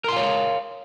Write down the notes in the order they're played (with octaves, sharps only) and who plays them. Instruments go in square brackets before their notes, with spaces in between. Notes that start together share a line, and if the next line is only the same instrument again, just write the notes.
[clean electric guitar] A#4
C6
F5
C#5